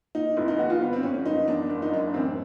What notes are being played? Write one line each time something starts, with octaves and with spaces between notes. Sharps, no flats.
A#2 D#4
F1 E4
D#4
D#2 F#4
F4
G1 B3
C4
F2 C#4
C#4
F#1 D#4
E2 D4
F#1 D4
D#4
F#2 D4
A1 C4